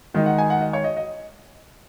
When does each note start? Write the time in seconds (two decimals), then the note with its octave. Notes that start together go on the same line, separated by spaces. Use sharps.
0.14 D#3 G#3 D#4
0.26 F#5
0.38 G#5
0.50 F#5
0.61 D#5
0.73 C#5
0.84 D#5
0.97 D#5